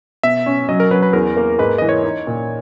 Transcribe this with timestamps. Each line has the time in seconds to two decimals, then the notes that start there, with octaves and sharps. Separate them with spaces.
0.23 B2 E5
0.46 C#4
0.69 F#3 D#5
0.80 A#4
0.91 F#3 B4
1.02 B4
1.13 E2 A#4
1.37 A#3
1.59 G#2 B4
1.78 E3 D#5
1.89 C#5
2.04 D#4
2.27 A#2